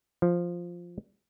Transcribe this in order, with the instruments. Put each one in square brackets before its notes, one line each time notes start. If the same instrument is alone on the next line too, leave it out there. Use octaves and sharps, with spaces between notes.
[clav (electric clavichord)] F3